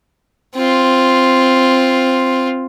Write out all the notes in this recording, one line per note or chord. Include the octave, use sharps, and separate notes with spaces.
C4 F4